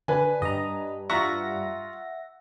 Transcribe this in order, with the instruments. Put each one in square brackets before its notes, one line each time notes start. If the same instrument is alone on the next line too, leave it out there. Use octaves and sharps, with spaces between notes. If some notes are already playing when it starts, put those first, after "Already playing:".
[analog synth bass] D3 [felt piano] B4 G#5
[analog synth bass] G2 [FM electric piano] D#5 A#5
[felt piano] F4 A#5 C#6 [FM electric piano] E5 F#5 A#6